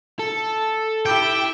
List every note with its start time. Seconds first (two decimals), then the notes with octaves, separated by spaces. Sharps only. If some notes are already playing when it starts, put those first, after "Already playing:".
0.19 A4
1.06 E4 G4 G5